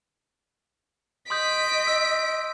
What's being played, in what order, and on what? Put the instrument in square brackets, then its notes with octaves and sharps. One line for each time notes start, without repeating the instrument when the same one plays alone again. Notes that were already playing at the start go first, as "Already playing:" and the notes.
[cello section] D#5 [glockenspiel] C6 D#6 G6 [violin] B6 D7
[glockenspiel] E6